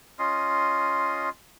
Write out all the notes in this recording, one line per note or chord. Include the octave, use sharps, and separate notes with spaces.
C#4 F4 D#5 C6